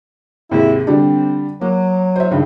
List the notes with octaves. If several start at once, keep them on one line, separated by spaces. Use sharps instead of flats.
D#2 G#2 C3 E4
D3 G3 C4 D4
F#3 A#3
C5 E5
C#2 G2 D#3